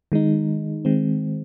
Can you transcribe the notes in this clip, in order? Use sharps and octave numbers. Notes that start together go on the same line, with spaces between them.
D#3 G#3 D#4
D#3 G#3 C4